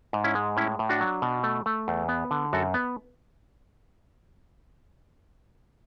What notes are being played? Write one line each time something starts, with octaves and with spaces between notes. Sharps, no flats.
G#2
C#4 E4
G#3
A2 C#4 E4
A2
D4 F#4
F#3
B2
A3
A3
E2
B3
D3
F#2 F#4 A4
B3